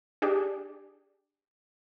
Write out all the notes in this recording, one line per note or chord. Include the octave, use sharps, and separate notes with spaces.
D4 G4 G#4 D5